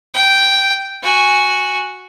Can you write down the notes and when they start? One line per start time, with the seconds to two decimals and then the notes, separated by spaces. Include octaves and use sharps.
0.14 G5
1.03 F#4 G#5